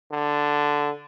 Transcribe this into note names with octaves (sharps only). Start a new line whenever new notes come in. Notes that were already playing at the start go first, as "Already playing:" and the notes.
D3